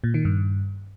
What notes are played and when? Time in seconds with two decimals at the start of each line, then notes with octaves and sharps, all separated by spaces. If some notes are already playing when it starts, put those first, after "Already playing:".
0.04 A#2
0.14 D#3
0.25 G2